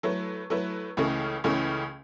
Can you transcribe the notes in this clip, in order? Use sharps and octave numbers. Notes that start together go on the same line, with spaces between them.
F#3 A3 E4 B4
F#3 A3 E4 B4
C#2 C#3 E3 A3 C#4
C#2 C#3 E3 A3 C#4